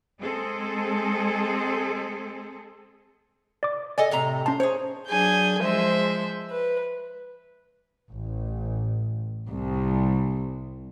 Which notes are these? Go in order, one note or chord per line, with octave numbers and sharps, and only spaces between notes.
G#3 C4 G#4 A4
D5 D6
A4 D5 D#5 G#5
A2 C3 A#5
C#4 C5 A5
G#4 C5 C#5
F#3 D4 G#4 G#5 G6
F3 G#3 C5 E5
B4
A1
C2